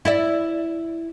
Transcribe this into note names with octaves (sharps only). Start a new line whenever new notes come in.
E4 D5 E5